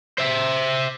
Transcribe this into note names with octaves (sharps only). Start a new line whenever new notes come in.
C5 E5